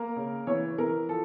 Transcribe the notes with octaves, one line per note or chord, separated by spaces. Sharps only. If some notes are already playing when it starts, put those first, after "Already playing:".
Already playing: A#3 A#4
C#3
E3 C#5
E3 A#4
F3 A4